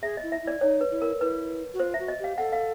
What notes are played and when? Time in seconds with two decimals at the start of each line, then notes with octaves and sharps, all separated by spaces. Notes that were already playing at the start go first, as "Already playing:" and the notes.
0.02 G#4 E5
0.17 D#5
0.23 E4
0.32 E5
0.43 E4 D5
0.61 D#4 C#5
0.81 B4
0.91 E4
1.02 A#4
1.21 E4 B4
1.74 F#4
1.80 F4 C5
1.94 E5
1.99 F#4
2.08 D#5
2.19 G4 F5
2.38 A4 F#5
2.52 F5